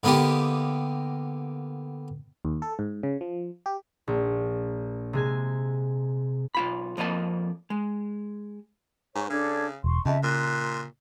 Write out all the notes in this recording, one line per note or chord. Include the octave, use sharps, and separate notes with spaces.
D3 A#3 B3 D#4 G4
D#2
A4
G#2
C#3
F3
G4
A#1
C3 G#3 G#5
B1 F4 B5
F2 F3 A#3 D#5 A5
G#3
G#2 B4 C#5 C#6
C#3 D4 A4 G#6
E1 C6 C#6
F2 C#3 D#5 E5 A5
A#2 C6 F#6